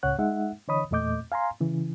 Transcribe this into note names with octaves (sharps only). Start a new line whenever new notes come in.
C#2 A2 C#3 C#5 F#5 F#6
G#3 D#4 E5 F#5
D3 E3 C#5 D#5 B5 D#6
E2 A#2 A3 D#5 D6 G6
F5 G#5 A#5 C6
C#3 E3